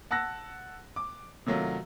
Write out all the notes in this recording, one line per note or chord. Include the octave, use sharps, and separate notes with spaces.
F#5 A5 E6 F#6 A#6
D6
C3 D#3 F#3 A3 F4